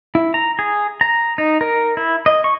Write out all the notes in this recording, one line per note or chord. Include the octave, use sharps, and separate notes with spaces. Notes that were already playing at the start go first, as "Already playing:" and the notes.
E4
A#5
G#4
A#5
D#4
A#4
E4
D#5
C#6